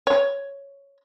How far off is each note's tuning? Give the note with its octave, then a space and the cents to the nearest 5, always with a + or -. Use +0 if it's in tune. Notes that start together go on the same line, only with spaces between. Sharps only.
C#5 +5